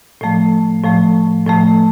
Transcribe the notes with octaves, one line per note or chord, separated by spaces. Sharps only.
A2 F3 A3
A2 F3 A3
A2 F3 A3